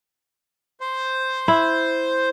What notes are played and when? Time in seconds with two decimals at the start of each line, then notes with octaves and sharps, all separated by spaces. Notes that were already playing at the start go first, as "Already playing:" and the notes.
0.81 C5
1.48 E4